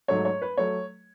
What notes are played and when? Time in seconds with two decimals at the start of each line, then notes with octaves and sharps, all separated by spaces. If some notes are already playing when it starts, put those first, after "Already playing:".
0.08 G#2 F#3 A3 C#5
0.25 C#5
0.42 B4
0.57 F#3 A3 C#5